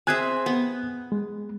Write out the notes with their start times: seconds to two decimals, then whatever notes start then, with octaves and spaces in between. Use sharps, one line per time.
0.07 C4 G#4 E5 G#5 F#6 G#6
0.46 B3
1.12 G#3